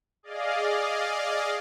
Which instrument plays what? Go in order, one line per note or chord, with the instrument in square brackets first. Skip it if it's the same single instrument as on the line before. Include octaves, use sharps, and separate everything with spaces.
[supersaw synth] G#4 D5 D#5 F5